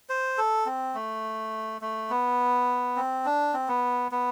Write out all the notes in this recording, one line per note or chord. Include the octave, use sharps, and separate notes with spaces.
C5
A4
C4
A3
A3
B3
C4
D4
C4
B3
B3